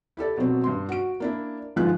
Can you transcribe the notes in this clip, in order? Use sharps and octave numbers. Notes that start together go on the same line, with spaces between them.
E4 G4 A4 D5
B2 F#3 C4
G2 C6
F#4 D7
A#3 D4 E4
G1 G#2 F3 G#3 F4 F#6